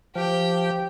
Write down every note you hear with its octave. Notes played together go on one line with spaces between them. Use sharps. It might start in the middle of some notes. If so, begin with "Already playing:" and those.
F3 G4 G5